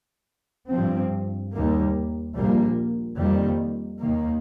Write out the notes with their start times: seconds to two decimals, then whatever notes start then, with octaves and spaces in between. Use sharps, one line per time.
0.70 G2 F3 C4
1.52 D#2 D#3 G3 A#3
2.35 A#1 A#2 G3 A#3
3.17 F2 D#3 G3 A#3
3.99 D#2 D#3 A#3